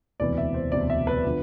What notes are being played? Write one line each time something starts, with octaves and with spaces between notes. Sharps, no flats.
E1 D2 C3 E3 D5
E5
C5
E1 D2 C3 E3 D5
E5
B4
D3 F3